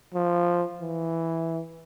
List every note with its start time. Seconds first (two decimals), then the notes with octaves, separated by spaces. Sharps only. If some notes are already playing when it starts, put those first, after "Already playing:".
0.14 F3
0.81 E3